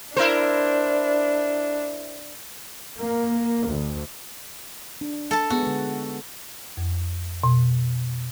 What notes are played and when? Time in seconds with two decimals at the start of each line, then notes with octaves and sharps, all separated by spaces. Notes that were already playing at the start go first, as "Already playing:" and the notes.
0.17 D4 E4 A#4 C5
2.98 A#3
3.66 D2
5.01 D4
5.31 A4 A5
5.50 G#3 B3 F#4 G#4
5.63 D3 G#3
6.77 F2
7.44 B2